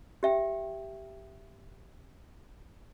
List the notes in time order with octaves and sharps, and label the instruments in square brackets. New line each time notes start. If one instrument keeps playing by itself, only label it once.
[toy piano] G4 E5 G5